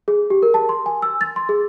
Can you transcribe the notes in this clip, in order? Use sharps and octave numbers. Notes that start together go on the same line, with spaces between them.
G#4
G4
A#4
A5
C6
G#5
E6
A6
C6
G#4